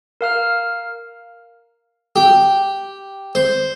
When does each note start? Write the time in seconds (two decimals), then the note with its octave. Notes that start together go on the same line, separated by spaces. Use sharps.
0.21 A#4 F5 F6
2.16 G4
3.35 C5